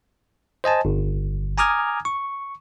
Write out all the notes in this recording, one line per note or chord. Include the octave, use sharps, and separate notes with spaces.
C5 D#5 G#5 A5
G1
G#5 A#5 D6 D#6 F6 G#6
C#6